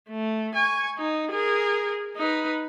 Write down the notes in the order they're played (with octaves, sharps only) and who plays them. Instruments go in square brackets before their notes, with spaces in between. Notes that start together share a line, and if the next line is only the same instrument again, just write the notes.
[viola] A3
G#5 C#6
D#4
G#4 A#4
D#4 B4